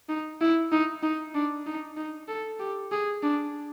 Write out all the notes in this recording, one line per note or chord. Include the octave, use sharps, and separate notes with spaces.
D#4
E4
D#4
D#4
D4
D#4
D#4
A4
G4
G#4
D4